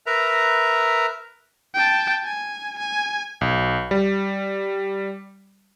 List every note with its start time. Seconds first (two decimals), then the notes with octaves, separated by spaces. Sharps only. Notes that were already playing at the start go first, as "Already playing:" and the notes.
0.06 A#4 B4 E5 A#5
1.74 G5 A5
2.25 G#5
2.79 G#5
3.41 B1
3.91 G3